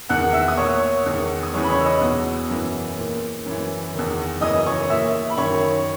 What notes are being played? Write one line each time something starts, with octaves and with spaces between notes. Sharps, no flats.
E2 D#3 F#5 F#6
E5 E6
D#6
A#2 C#5 C#6
E2 D#3
D#6
E2 C#3 E3 C#5 C#6
B5
C#5 C#6
E6
D#5 D#6
E2 B2
F#2 E3
A#2
F#2 E3
E2 D#3
F#2 C#3 E3 D#5 D#6
C#5 C#6
A#2 E5 E6
B5
F#2 D#3 C#5 C#6